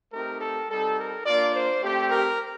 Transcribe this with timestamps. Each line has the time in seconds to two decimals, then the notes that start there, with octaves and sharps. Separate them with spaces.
0.13 A3 C4 D#4 G4 A#4
0.41 A4
0.69 G3 C4 D#4 G4 A4
0.98 A#4
1.26 A#3 D4 F4 D5
1.54 C5
1.82 A3 C4 G4
2.11 A#4